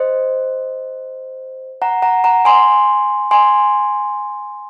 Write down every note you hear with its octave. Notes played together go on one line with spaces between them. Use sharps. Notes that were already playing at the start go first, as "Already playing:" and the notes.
Already playing: C5 D#5
F#5 A#5
F#5 A#5
F#5 A#5
G#5 C6
G#5 C6